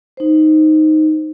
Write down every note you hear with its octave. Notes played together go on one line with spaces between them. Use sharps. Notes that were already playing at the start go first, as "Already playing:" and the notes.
D#4 C5